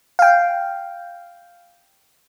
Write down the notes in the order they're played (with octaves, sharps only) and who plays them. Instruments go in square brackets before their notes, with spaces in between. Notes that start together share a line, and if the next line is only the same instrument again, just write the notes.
[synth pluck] F5 G5